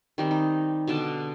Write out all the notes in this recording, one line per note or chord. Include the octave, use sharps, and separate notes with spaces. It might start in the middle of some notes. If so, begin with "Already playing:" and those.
D#3 G3 C4
D#4
B2 D3 D5 A5